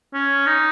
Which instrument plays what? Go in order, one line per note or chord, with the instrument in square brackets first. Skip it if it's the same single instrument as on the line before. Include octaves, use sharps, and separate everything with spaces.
[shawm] C#4
D#4